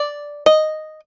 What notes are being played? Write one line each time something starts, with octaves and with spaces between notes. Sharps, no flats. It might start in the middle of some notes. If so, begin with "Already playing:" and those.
Already playing: D5
D#5